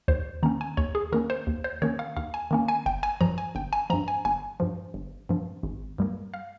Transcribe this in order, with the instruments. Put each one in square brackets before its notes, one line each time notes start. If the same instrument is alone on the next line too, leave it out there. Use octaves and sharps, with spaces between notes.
[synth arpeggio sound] D#2 C5
D#3 A#3 C#4 A#5
G#5
D#2 C#5
G#4
D#3 A#3 C#4 A#4
C5
D#2
C5
D#3 A#3 C#4 C#5
F5
D#2 F5
G#5
D#3 A#3 C#4
G#5
G1 G5
G#5
G2 F3 A#5
G#5
G1 G5
G#5
F3 A#5
G2
G#5
G1 G#5
G2 F3
G1
G2 F3
G#1
G2 G3 A#3
F5